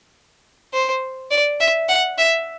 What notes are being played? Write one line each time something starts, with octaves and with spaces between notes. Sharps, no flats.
C5
D5
E5
F#5
E5